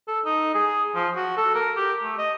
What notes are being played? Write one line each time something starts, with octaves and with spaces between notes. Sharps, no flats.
A4
D#4
G#4
F3
F#4
A4
A#4
G4
A3
D#5